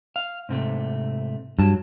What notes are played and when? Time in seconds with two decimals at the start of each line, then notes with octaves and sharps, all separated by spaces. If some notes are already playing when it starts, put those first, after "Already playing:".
0.16 F5
0.49 G#2 C3 A3
1.59 G2 F#3 A5